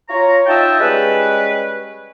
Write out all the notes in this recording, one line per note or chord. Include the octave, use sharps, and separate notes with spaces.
F4 C#5 A#5
D#4 F4 D#5 E5 G5 A5
G3 G#3 C#4 B4